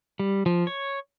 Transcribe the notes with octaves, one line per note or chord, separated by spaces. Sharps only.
G3
F3
C#5